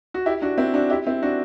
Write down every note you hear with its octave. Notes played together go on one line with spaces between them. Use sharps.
F#4
E4 G4
D4 F#4
C4 E4
D4 F#4
E4 G4
C4 E4
D4 F#4